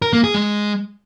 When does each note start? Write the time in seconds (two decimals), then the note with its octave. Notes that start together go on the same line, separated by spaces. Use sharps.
0.02 A#4
0.13 A#3
0.24 G#4
0.35 G#3